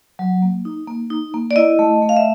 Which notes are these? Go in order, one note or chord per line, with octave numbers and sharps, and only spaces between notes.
F#3
A#3
D#4
A#3
D#4
A#3
D5
E4 D#5
A3
A3
F5
E5